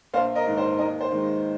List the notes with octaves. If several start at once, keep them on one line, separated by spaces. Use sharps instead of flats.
A#1 C5 F5
A#4 D#5
G#2 D#3
C5
D#2 A#4 D#5
C5
D#3 G#3 D#4